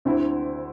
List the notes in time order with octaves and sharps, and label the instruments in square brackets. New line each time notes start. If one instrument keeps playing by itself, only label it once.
[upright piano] D2 D3 C4 E4